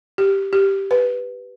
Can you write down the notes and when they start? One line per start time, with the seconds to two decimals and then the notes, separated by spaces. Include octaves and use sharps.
0.18 G4
0.53 G4
0.91 B4